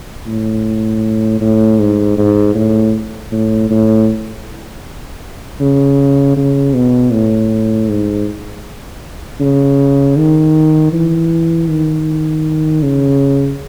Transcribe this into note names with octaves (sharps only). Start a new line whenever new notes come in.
A2
A2
G#2
G#2
A2
A2
A2
C#3
C#3
B2
A2
G#2
C#3
D#3
E3
D#3
C#3